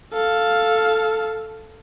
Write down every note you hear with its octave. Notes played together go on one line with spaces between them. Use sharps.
A4 F5